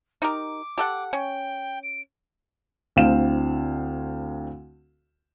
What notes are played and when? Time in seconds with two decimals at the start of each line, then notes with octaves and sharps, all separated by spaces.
0.22 D#4 G4 A#4 D6
0.78 G4 A4 F#5
1.13 C#4 G5
1.83 D7
2.96 D2 D3 C4 E4 F5 E7